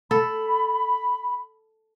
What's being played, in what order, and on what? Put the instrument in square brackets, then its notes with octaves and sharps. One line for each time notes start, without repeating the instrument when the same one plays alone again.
[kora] A4 [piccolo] B5